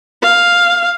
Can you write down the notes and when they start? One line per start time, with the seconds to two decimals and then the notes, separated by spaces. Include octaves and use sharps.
0.22 F5